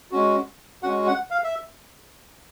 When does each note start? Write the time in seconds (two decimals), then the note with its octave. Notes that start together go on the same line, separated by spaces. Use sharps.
0.12 G#3 C#4 F#4
0.83 G#3 C#4 F#4 F#5
1.07 F#5
1.31 F5
1.44 E5